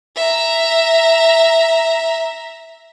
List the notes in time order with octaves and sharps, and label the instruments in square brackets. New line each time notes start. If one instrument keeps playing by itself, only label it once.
[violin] E5 A#5